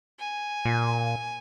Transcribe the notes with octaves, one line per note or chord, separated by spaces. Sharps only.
G#5
A#2